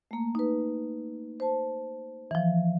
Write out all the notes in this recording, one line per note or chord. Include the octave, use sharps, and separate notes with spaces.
A3 A#3
D#4 B4
C5 A5
E3 F3